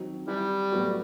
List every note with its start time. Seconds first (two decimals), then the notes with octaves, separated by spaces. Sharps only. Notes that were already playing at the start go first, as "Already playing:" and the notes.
Already playing: D#3 F#3 C4 F#4
0.27 E3 G3
0.72 A2 F#3 B3 F#4